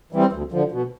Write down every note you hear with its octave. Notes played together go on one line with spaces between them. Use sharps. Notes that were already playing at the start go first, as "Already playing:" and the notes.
E3 G3 C4
D2
D3 F3
B2